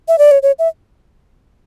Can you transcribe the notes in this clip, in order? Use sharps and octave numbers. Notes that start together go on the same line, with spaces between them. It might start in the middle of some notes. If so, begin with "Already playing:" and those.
E5
D5
C#5
C#5
E5